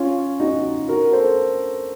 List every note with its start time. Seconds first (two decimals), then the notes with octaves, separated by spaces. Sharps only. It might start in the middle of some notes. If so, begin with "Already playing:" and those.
Already playing: C#4 F4
0.40 D#4 F#4
0.88 F#4 A#4
1.13 A4 C5